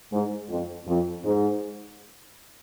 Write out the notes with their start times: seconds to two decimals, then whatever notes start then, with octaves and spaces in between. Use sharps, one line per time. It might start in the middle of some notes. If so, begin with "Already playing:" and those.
0.12 G#2
0.49 F2
0.88 F2
1.25 G#2